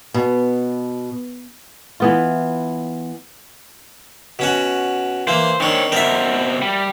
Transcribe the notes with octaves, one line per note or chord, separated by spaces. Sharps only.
B2
E3 B3 F4
B2 C#4 F#4
E3 A#3 C5
D#3 C4 D4 C#5
B2 C4 A#4 E5
G3